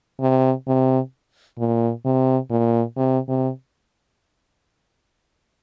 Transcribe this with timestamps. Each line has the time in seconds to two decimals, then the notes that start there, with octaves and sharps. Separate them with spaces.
0.20 C3
0.67 C3
1.58 A#2
2.05 C3
2.50 A#2
2.97 C3
3.28 C3